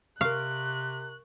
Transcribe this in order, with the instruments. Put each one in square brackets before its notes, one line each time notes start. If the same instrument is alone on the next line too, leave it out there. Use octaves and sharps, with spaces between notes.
[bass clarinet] C3 [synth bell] A#4 C#6 [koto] F5 [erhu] F#6